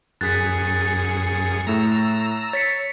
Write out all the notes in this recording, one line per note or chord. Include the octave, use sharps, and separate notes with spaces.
F#2 G#4 F#6 A6 B6 C#7
A2 A3 A#5 E6
C#5 A6 B6 C#7